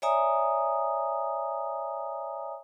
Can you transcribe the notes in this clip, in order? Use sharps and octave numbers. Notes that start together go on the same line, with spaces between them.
C#5 D5 E5 G#5 A#5 D#6